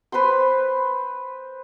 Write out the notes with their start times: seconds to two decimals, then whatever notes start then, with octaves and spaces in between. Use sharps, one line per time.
0.12 B4 C5 B5 C6